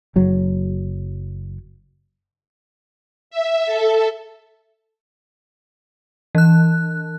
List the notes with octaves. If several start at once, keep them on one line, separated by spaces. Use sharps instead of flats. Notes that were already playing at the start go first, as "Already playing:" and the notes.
F#1 F#3
E5
A4
E3 F#6